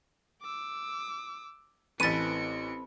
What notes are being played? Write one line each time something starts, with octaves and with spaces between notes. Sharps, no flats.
D6 E6
A1 E3 C4 A4 B4 A6 C#7 D#7